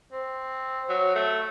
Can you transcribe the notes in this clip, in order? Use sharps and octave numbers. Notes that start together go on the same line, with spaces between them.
C4
F#3
A3